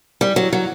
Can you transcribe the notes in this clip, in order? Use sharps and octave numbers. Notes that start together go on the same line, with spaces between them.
G3
F#3
F#3